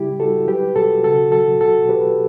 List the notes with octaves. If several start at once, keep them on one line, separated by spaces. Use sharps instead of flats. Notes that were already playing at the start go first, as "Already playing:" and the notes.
Already playing: C#3 G3 E4 G4
G3 F#4 A4
F#3 G4 B4
B2 F#4 A4
C#3 F#4 A4
F#3 F#4 A4
B2 F#4 A4
B2 G4 B4